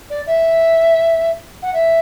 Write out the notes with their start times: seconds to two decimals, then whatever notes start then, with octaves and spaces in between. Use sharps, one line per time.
0.10 D5
0.27 E5
1.62 F#5
1.74 E5